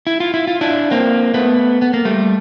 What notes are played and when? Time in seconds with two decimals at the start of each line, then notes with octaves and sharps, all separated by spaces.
0.07 E4
0.20 F4
0.34 E4
0.47 F4
0.61 D4 E4
0.91 A#3 C4
1.34 A3 B3
1.82 B3
1.94 A#3
2.05 G3 A3